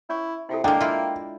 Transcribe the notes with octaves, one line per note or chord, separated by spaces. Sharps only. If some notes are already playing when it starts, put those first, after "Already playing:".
C#4 E4 C#5 C#6
C3 E4 F4 A4
G#3 A#3 D4 A4 D#5 G5
E4 F4 E5